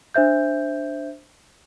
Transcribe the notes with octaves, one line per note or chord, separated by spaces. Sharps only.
D4 C5 E5 G6